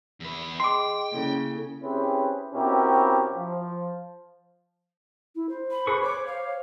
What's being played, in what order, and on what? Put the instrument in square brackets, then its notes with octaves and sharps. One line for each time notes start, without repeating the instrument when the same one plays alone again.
[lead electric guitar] E2 B4
[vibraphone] G#4 D#5 [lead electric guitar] G5 [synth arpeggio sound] C6 D6
[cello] C#3 [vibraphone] A#3 E4 A4
[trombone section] C4 C#4 E4 G4 G#4 B4
B2 C4 C#4 E4 G4 A#4
F3
[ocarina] E4
C5
[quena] B5
[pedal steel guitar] G#4 B4 C#6
[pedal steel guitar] C#5 [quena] D6
[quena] F5